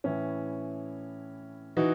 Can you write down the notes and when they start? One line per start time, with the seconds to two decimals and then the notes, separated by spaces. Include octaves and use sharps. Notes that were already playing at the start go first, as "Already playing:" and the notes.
0.04 A2 E3 C#4 E4
1.77 E3 D#4 F#4